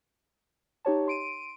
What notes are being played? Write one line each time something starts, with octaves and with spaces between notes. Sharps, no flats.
D#4 G4 C#5 A5
C6 D7 D#7